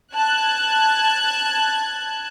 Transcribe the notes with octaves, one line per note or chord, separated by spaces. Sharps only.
A5 F#6 G#6